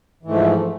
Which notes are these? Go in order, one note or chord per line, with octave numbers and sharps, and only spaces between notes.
G#2 E3 F3 A3